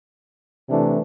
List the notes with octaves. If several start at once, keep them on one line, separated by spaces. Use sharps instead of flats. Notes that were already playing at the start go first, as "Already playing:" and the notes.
C3 E3 A3 D4